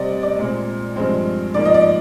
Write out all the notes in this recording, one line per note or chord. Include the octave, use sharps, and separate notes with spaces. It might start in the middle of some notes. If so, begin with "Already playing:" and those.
Already playing: C3 G3 C4 D5 D#5
D5
A#2 G#3 C4
G2 F3 G#3 C4
G#2 F3 A#3 D5
D#5
D5